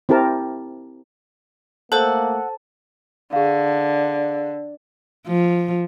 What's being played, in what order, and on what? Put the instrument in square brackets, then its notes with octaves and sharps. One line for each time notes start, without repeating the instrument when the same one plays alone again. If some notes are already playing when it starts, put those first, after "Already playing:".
[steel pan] C4 E4 G4 A#4 A5
[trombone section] A3 A#3 [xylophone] A4 C5 [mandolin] F#5 E6 [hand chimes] A5
[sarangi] D3 [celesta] G#4 F5
[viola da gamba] F3